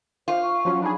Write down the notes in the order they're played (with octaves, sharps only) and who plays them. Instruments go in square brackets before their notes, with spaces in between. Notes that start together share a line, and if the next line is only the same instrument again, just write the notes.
[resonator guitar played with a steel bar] F4 [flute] C5
[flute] C#6
[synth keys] F3 F#3 C#4
[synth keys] D4 D#4 G#4 [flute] B5